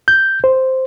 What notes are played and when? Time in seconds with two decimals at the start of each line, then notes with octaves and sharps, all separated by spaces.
0.08 G6
0.44 C5